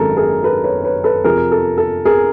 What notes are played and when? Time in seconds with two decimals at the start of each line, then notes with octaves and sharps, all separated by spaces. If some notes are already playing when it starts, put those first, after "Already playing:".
Already playing: G#1 F#2 D#3 G#3 A4 A#4
0.17 G#4 A#4
0.44 A4 B4
0.64 B4 C#5
0.84 B4 C#5
1.04 A4 B4
1.24 F2 C3 F3 G#4 A#4
1.52 A4
1.78 A4
2.05 G#4 A#4